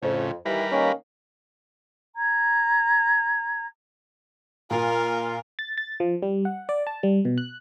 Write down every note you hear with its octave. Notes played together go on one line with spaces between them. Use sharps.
F2 A2 C#3
D#2 E3 G3 A#4 B4
D#3 A#3 C#4
A#5 G#6
A#2 F4 A#4
A6
A6
F3
G3
F#5
D5
A5
G3
B2
F#6